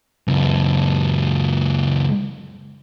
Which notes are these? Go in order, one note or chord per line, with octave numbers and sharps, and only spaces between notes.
C#2 F#2